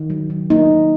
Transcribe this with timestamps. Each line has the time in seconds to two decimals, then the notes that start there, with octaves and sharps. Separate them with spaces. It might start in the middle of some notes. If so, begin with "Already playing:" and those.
Already playing: D#3
0.10 F#3
0.30 D#3
0.50 A#3 D#4
0.71 D#3